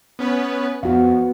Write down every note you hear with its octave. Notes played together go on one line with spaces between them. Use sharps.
B3 C#4 B4
F2 B3 F#4 F5